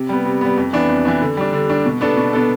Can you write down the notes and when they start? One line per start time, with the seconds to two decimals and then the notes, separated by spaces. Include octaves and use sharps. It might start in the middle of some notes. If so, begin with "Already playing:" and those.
Already playing: C3
0.09 G3 B3
0.25 C3
0.41 G3 B3
0.58 F2
0.73 E3 B3 D4
0.88 F2
1.05 E3 B3 D4
1.21 D3
1.37 G3 D4
1.53 D3
1.69 G3 D4
1.85 B2
2.01 B3 D4 A4
2.17 B2
2.33 B3 D4 A4